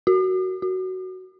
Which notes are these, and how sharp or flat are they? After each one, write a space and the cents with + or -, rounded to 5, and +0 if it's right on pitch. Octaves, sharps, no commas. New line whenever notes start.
F#4 +10
F#4 +10